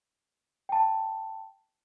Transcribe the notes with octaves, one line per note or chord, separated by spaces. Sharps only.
G5 A5